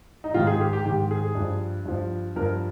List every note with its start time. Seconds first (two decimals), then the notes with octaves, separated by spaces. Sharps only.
0.24 D#4
0.34 G#2 D#3 F4
0.47 G#4
0.60 G4
0.73 G4
0.85 G#2 D#3 G4
1.11 G#4
1.35 G2 F3
1.85 G2 F3
2.36 G2 F3 A#4